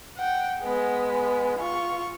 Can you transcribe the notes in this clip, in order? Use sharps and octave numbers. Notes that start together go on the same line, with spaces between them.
F#5 G5
G#3 B3
F4 C#6